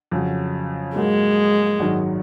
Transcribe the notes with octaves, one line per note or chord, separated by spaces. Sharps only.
F2 C#3 F#3
G#2 F#3 G#3 A#3
G#1 F#2 D#3 F#3